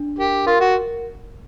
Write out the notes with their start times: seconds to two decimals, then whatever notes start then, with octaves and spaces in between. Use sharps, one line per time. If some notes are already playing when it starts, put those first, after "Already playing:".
Already playing: D4
0.18 G4 A#4
0.46 F4 A#4
0.60 F#4